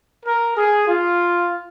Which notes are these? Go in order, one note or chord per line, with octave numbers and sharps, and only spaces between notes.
A#4
G#4
F4